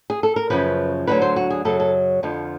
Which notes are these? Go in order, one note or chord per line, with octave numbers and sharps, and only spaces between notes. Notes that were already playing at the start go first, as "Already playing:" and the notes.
G#4
A4
A#4
F#2 C#3 F3 B4
D2 D3 F#3 B4
C5
F#4
G#4
F#2 C#3 F#3 A4
A4
F2 D3 F3